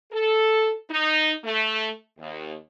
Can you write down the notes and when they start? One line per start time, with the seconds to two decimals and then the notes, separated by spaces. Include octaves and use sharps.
0.12 A4
0.91 D#4
1.44 A3
2.19 D#2